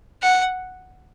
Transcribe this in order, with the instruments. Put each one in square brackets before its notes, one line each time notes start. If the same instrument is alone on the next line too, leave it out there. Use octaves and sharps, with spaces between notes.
[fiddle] F#5